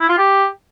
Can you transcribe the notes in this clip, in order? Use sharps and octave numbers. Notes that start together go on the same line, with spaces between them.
E4
F4
G4